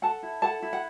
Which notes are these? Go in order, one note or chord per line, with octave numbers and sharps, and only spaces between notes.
A4 F#5 A5
E4
A4 F#5 A5
E4
F#5